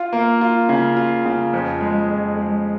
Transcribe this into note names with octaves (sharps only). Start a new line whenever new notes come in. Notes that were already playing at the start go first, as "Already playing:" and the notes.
Already playing: F4
A#3
F4
C#3
F4
C#3
F2
G#3
F2
G#3